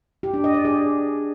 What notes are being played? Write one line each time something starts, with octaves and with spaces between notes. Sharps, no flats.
G4
D4
D#5
D5
G#4